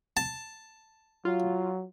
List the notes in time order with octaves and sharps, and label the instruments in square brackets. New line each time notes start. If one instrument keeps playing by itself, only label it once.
[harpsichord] A5
[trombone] F#3 [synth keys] F4